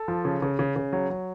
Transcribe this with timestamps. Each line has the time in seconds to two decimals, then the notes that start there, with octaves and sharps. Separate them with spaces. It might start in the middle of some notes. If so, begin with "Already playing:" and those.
Already playing: A4
0.08 F3
0.25 C#3
0.42 C#3
0.59 C#3
0.76 C#3
0.93 F#3
1.10 F#3